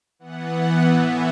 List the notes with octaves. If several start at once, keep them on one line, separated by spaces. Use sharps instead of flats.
E3 B3 F#5
F#5
A2 E3 B3 E5